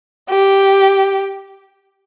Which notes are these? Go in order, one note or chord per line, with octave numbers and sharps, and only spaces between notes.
G4